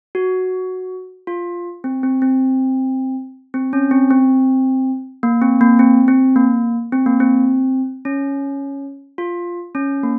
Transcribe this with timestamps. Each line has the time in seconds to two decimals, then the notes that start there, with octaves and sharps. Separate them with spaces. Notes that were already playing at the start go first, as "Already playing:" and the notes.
0.15 F#4
1.27 F4
1.84 C4
2.03 C4
2.22 C4
3.54 C4
3.73 C#4
3.91 C4
4.10 C4
5.23 A#3
5.42 C4
5.61 A#3
5.79 C4
6.08 C4
6.36 A#3
6.92 C4
7.06 A#3
7.20 C4
8.05 C#4
9.18 F4
9.75 C#4
10.03 A#3